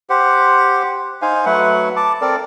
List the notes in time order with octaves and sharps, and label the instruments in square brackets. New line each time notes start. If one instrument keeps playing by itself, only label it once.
[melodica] G4 C5 F#5
D#4 C5 F5 G#5
F#3 A3 B4 F#5
A5 D6
C4 A4 A#4 D5